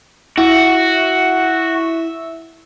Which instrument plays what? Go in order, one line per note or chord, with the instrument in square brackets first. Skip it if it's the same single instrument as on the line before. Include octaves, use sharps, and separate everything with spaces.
[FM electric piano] E4 [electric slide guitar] F#4 [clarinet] E5